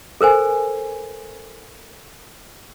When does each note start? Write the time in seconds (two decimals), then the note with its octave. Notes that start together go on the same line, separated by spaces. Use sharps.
0.21 A4 A#4 C5 G#5